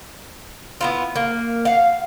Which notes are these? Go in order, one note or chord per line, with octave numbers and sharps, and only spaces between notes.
B3 E4 F4
A#3
F5 F#5